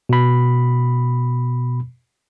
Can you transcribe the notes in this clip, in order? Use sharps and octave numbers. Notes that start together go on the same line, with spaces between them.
B2 B5